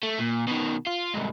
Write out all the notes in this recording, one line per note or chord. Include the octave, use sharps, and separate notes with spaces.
A3
A#2
B2 D#3
F4
C2 G#2